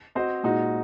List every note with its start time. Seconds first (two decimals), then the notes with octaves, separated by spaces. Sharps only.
0.15 C4 F#4 C5 D#5
0.43 A#2 G#3 D#4 F#4